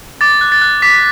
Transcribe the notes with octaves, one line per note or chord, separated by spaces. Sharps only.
D6 A6
F#6
A6
F#6
D6 B6